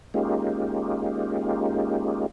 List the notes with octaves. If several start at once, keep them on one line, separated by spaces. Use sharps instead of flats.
G#3 A#3 C#4 D#4 F4 G4